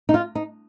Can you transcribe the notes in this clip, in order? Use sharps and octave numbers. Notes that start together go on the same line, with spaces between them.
D#4
F4
D#4